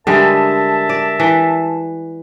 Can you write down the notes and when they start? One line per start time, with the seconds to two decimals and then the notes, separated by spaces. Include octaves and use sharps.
0.07 D3 G3 G#3 A#4 E5 A5
0.89 D5
1.20 E3